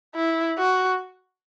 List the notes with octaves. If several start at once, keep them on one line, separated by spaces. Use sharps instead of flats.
E4
F#4